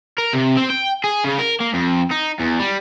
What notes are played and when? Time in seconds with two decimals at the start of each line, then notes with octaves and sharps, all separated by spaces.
0.18 A#4
0.33 C3
0.57 C4
0.70 G5
1.04 G#4
1.24 C#3
1.38 A#4
1.60 A#3
1.74 F2
2.11 D#4
2.39 E2
2.59 G3